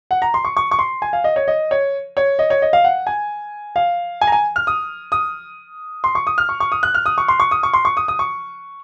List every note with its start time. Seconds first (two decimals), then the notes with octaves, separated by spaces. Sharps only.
0.11 F#5
0.22 A#5
0.34 C6
0.45 C#6
0.57 C#6
0.71 C#6
0.79 C6
1.02 G#5
1.13 F5
1.24 D#5
1.36 C#5
1.48 D#5
1.71 C#5
2.17 C#5
2.39 D#5
2.50 C#5
2.62 D#5
2.73 F5
2.84 F#5
3.07 G#5
3.76 F5
4.21 G#5
4.27 A#5
4.32 G#5
4.56 F6
4.67 D#6
5.12 D#6
6.04 C6
6.15 C#6
6.27 D#6
6.38 F6
6.49 C#6
6.60 C#6
6.72 D#6
6.83 F#6
6.94 F6
7.06 D#6
7.18 C#6
7.28 C6
7.40 C#6
7.51 D#6
7.63 C#6
7.73 C6
7.85 C#6
7.97 D#6
8.08 D#6
8.19 C#6